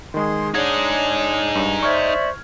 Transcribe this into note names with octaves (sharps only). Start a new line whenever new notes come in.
D#3 G#3 G#4 C6
D4 D#4 G#4 C#5 G#6
G2
C5 D5 E5 C#6 F6 G#6